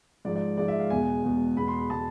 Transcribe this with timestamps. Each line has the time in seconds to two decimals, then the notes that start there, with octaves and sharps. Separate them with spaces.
0.25 G#2 F3 G#3 D5
0.36 D5
0.57 G#2 F3 G#3 D5
0.68 E5
0.80 F5
0.90 E2 B2 G#3 G#5
1.24 E2 B2 G#3
1.57 E2 B2 G#3 B5
1.68 C6
1.78 B5
1.90 B2 G#3 A5